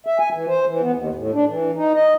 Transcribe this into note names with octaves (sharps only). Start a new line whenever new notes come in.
E5
G#5
E3
C5
E3
B3
D#2
A2
D4
E3
D#4
D#5